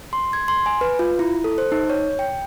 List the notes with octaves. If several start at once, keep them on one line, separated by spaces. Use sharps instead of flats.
C6
G#6
C6
G#5
B4
F4
E4
A4
C5
D#4
C#5
G5